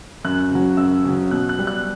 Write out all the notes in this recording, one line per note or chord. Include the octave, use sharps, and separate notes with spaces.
F#2 F#6
C#3 F#3
F#2 E6
C#3 F#3
B2 F#6
F#6
G3
F#6